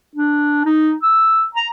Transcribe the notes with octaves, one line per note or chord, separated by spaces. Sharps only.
D4
D#4
E6
A#5